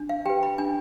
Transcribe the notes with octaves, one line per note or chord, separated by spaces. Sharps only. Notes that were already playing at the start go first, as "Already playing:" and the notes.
Already playing: D4
F5
G4 B4 G5
B5
D4 G#5